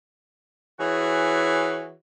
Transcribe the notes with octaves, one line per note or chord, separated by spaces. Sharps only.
E3 F#4 G#4 C#5